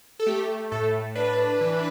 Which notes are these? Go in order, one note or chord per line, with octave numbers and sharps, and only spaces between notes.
A4
A3 G4
A2 A4
D4 B4
E3